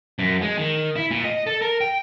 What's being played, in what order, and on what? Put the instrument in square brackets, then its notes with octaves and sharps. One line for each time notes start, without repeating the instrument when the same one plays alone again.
[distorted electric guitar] F#2
G#3
D#3
E4
A#2
D#5
A4
A#4
G5